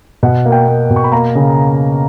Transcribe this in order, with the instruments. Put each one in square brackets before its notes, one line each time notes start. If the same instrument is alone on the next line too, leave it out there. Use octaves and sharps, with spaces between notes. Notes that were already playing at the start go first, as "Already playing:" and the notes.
[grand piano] B2 F#5
A#3
G5
A#3
B2
C#6
B5
A#3 A#5
C#3